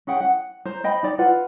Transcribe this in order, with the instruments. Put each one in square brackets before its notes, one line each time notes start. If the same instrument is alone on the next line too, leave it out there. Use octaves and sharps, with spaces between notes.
[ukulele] C#4 G#4 F#5 G5
F#5
C5 A#5
C5 D#5 G5 B5
D#4 D5
F4 B4 F#5